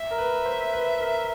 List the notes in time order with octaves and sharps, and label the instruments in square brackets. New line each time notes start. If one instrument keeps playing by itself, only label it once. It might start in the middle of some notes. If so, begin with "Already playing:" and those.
Already playing: [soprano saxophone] E5
[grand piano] A#4
B4
C5
B4
A#4